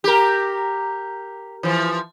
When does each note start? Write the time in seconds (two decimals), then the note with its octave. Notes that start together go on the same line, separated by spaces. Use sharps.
0.04 G4 A#4
1.63 E3 F3